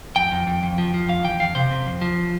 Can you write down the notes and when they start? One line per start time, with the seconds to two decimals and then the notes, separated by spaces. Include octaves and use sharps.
0.16 F2 G5
0.32 F2
0.47 F2
0.63 F2
0.78 F3
0.94 F3
1.09 F2 F5
1.24 E3 G5
1.40 F2 F5
1.55 C3 C5
1.71 C3
1.86 F2
2.01 F3